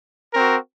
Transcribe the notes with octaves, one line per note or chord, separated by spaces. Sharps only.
C4 F#4 A#4